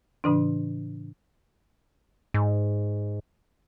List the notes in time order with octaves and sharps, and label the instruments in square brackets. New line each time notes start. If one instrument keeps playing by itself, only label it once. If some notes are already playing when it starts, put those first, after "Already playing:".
[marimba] A2 C#3 E3 D4
[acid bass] G#2